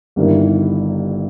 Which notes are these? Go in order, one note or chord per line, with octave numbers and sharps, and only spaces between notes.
G1 G2 D#3 A#3 E4